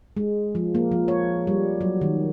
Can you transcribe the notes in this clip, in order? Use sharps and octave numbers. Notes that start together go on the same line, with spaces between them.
G#3
F3
A#3
F3
C#5
G3
F#3
D#3